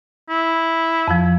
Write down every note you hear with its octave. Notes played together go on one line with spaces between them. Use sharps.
E4
F2 F3